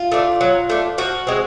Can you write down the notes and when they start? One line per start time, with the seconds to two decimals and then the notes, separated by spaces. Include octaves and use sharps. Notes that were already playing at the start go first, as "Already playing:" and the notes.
Already playing: F4
0.12 A3 D4
0.41 F#3
0.70 A3 D4
0.98 F3 F#4
1.27 G#3 C4